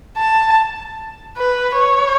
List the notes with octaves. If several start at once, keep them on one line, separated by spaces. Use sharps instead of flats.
A5
B4
C#5